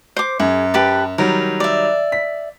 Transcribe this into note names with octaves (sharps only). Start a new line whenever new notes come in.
C5 D6
F#2 G#4
G4 B4 A5
D#3 F#3 G3 A#4
D5 E5
B6